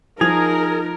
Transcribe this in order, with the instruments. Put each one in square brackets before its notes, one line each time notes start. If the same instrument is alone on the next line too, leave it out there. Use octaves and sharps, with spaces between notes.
[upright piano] F3 G#6 F7 [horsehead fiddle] D#4 [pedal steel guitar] G#4 [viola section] A#4